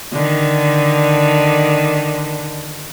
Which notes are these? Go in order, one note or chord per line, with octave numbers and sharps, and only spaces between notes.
D3 D#3